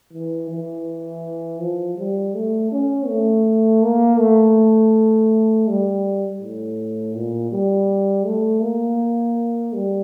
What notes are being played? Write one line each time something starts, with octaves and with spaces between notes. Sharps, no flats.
E3
E3
F3
G3
A3
C#4
A3
A#3
A3
G3
A2
A#2
G3
A3
A#3
G3